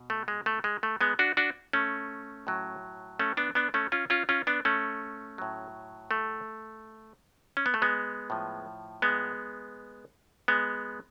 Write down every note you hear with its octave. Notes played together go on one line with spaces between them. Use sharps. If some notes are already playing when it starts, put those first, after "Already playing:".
Already playing: B2
A3
G#3
A3
G#3
A3
G#3 B3
D4 F#4
D4 F#4
A3 C#4
A2 F#3
A3 C#4
B3 D4
B3 D4
A3 C#4
C#4 F4
C#4 F4
C#4 F4
B3 D4
A3 C#4
A2 F#3
A3
C#4
B3
A3
G#3 B3
A2 F3
G#3 B3
G#3 B3